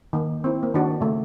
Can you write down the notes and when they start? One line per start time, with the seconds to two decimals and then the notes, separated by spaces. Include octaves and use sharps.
0.13 D#3 A#3
0.44 C4 E4
0.63 A#3
0.74 D#3 D4 F#4
1.01 C#3 A3